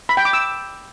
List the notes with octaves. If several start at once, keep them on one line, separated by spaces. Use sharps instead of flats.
B5
G5
D6
E6